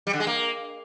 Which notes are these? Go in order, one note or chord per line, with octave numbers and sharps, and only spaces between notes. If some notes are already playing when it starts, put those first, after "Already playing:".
G3
D3
G#3
A#3